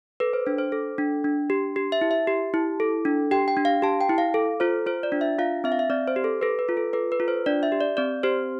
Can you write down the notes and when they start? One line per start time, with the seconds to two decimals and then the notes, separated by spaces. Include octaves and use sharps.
0.20 A4 B4
0.33 C5
0.46 D4 C5
0.58 C5
0.72 A4
0.98 D4
1.24 D4
1.50 G4
1.76 G4
1.92 E5
2.01 E4
2.11 E5
2.27 G4
2.54 E4
2.80 A4
3.05 D4
3.31 G4 G5
3.48 G5
3.57 D4
3.65 F5
3.82 G4 A5
4.01 G5
4.09 E4
4.18 F5
4.34 A4
4.60 F4 C5
4.86 F4 C5
5.03 D5
5.12 D4
5.21 E5
5.39 F4 F5
5.64 C4 E5
5.72 F5
5.79 E5
5.90 C4 D5
6.08 C5
6.16 G4
6.24 A4
6.41 A4 B4
6.59 B4
6.69 F4
6.77 A4
6.93 A4 B4
7.12 B4
7.20 F4
7.28 C5
7.46 D4 D5
7.63 E5
7.72 G4
7.81 D5
7.97 C4 D5
8.23 G4 C5